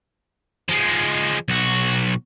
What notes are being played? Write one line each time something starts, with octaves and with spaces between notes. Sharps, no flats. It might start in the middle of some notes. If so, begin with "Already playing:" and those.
F3 G#3
B1 F#4